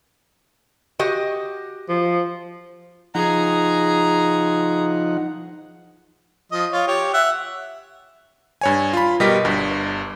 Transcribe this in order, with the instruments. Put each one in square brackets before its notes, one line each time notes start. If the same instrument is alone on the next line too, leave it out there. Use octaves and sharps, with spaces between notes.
[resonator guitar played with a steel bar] F#4 G4 D#5
[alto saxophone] F3
[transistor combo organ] F3 D#4 F#5 [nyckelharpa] G#4 A#5
[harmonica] F3 D#5
F4 C#5
G4 C#5
E5 F#5
[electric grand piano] G2 C#5 G#5
F4 B5
B2 G3 G4 A#4 D#5 B6
G1 G2